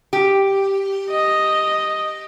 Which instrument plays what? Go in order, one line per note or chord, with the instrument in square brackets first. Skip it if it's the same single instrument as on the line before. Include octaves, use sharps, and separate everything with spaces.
[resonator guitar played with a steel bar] G4
[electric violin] D#5